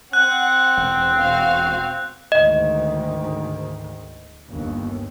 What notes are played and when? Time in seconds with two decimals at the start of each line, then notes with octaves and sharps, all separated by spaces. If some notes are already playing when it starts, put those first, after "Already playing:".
0.13 C4 F#5 F#6
0.77 E1
1.19 F#4 F5
2.32 D2 G#2 D#3 D#5
4.48 G1 D#2